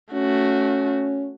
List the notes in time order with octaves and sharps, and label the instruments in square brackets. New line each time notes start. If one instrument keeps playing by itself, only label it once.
[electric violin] A3 F#4 [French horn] C#4